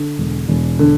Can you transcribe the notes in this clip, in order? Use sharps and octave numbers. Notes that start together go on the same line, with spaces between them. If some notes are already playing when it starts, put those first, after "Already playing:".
Already playing: D3
E1
E1
D3